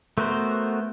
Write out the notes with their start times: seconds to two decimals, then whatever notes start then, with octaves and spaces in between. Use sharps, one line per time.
0.18 A3 B3 F#4 A#4 C5